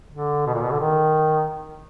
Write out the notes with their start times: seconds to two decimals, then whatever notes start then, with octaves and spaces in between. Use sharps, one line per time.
0.11 D3
0.46 B2
0.54 A#2
0.62 B2
0.71 D3
0.80 D#3